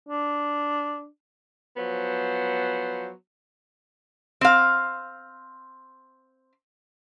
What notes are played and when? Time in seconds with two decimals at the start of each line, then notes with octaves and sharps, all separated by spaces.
0.09 D4
1.77 F3 F#3 B3 C5
4.41 C4 F5